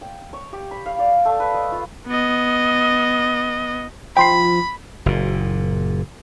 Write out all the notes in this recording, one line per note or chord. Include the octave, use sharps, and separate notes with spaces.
G5
C#5
G4
B5
F5
D5
A3
B4
D#5
F4
B3 D#5
F3 G5 B5 C6 C7
F#1 A#2